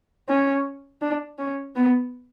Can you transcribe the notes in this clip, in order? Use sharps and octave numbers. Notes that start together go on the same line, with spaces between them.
C#4
D4
C#4
B3